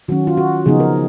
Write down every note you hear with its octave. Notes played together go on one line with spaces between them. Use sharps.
D#3 F#3 C#4 F#4
F4
F#4
C#3 F3 B3 D#4 G#4
A#4